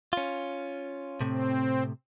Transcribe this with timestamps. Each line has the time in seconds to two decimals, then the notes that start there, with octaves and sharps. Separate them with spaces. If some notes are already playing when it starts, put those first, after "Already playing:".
0.13 C#4 F4
1.21 A2 C3 C4